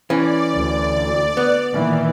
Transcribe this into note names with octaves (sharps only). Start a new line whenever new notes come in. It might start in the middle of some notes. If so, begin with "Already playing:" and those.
E3 C#4 D5
D2
B3
A#2 D#3 E3